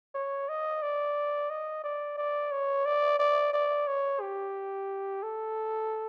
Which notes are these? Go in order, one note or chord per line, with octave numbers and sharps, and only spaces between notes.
C#5
D#5
D5
D#5
D5
D5
C#5
D5
D5
D5
C#5
G4
A4